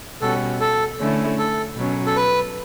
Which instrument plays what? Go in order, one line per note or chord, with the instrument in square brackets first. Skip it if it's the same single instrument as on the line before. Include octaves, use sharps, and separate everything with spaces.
[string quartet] B2 G3 C#4 F#4 [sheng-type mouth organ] A4
[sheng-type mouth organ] A4
[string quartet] D3 A3 C#4 E4
[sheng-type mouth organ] A4
[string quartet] B2 F#3 C#4
[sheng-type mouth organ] A4
B4